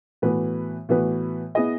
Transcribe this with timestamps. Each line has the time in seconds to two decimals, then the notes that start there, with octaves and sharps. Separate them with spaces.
0.22 A2 E3 B3 F#4 B4
0.89 A2 E3 B3 F#4 B4
1.55 B3 E4 G#4 D#5